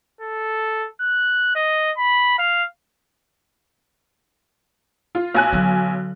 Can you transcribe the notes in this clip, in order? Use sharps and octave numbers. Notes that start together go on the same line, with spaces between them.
A4
F#6
D#5
B5
F5
F4
B1 G#5 F#6
D3 F#3